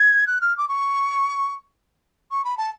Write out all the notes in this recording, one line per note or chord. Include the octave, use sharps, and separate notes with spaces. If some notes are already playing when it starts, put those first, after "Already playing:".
Already playing: G#6
F#6
F6
D6
C#6
C#6
B5
A5